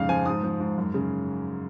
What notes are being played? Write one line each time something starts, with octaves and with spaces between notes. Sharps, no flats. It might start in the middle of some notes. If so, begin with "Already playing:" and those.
Already playing: F2 G#2 C#3 F5
F3 G#5
G#2 D#6
F3
G#2
F#2
C#3